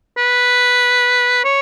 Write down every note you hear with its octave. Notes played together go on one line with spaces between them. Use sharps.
B4
C#5